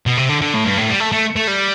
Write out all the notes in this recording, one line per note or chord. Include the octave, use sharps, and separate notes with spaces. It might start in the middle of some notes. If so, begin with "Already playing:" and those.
B2
C3
D3
D3
A2
G2
A2
G3
A3
A3
A3
G3